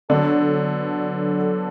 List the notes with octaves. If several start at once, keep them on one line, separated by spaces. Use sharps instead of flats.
D3 F#3 B3 D4 A4